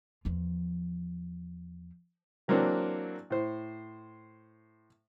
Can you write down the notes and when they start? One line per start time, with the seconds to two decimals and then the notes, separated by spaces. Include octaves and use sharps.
0.25 E2 F3
2.48 E3 F#3 A#3 C4 D4
3.30 A2 C5